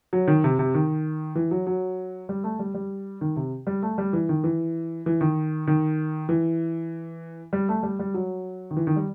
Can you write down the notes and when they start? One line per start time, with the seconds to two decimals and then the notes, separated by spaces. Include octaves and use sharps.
0.13 F#3
0.28 D#3
0.44 C3
0.59 C3
0.74 D#3
1.35 E3
1.51 F#3
1.67 F#3
2.29 G3
2.44 A3
2.59 G3
2.74 G3
3.21 D#3
3.36 C3
3.67 G3
3.82 A3
3.98 G3
4.13 E3
4.29 D#3
4.44 E3
5.06 E3
5.21 D#3
5.67 D#3
6.29 E3
7.53 G3
7.69 A3
7.83 G3
7.99 G3
8.14 F#3
8.71 D#3
8.77 E3
8.87 D#3
8.96 G3